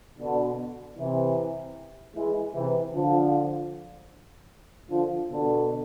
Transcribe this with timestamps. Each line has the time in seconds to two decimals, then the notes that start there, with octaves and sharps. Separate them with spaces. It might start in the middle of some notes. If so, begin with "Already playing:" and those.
0.19 B2 D3
0.98 C3 E3
2.16 E3 G#3
2.55 C3 E3
2.94 D3 F3
4.90 D3 F3
5.29 B2 D3